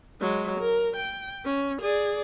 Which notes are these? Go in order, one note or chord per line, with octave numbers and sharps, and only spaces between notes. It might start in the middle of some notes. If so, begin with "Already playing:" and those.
F#3 G#3
A#4
G5
C#4
G#4 D5